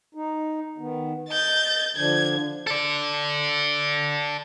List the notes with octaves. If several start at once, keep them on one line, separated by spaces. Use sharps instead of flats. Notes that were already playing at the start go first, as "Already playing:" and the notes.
D#4
D#3 B3
D#5 G6 A6
D3 F3 D4 G#6
A4 D5